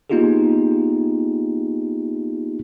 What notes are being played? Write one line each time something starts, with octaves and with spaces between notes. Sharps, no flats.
A#3 B3 D#4 F4 G4 G#4